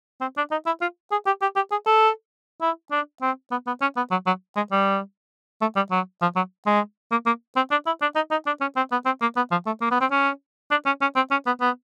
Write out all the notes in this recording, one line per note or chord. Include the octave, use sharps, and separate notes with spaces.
C4
D4
D#4
E4
F4
G#4
G4
G4
G4
G#4
A4
E4
D4
C4
B3
B3
C#4
B3
F#3
F#3
G#3
G3
A3
G3
F#3
F3
F#3
G#3
A#3
A#3
C4
D4
E4
D4
D#4
D#4
D4
C#4
C4
B3
C4
A#3
B3
F3
A3
A#3
B3
C4
C#4
D4
C#4
C#4
C4
C#4
B3
B3